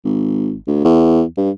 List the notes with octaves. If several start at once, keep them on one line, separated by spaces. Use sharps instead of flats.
G#1
D2
E2
G2